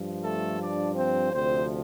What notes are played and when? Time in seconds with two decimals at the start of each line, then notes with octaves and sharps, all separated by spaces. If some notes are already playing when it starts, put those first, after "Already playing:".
Already playing: G2 F3
0.23 A3 A4
0.60 D4 D5
0.96 C4 C5
1.32 D2 C3 F3 C4 C5